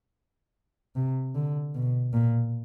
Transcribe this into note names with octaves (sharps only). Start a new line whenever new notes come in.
C3
D3
B2
A#2